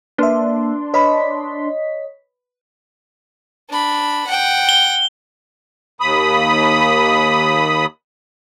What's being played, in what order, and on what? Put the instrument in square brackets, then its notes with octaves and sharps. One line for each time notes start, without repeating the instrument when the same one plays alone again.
[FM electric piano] A#3 E5 [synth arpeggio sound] D4 C6 [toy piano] B4
[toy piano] B4 B5 [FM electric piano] C#5 D#5 B6
[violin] D4 B5
F#5 G5
[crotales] G7
[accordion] D#2 B5 D#6